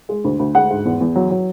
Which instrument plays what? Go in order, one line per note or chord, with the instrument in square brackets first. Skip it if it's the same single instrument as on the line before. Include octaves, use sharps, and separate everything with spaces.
[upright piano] G#3
D2
D2
G#3 F#5
G#2
E2
E2
F#3
F#3